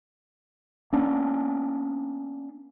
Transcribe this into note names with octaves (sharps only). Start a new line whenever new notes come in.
A#3 B3 C#4 D4